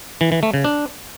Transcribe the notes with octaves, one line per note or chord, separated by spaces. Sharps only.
E3
E3
A3
C#3
D4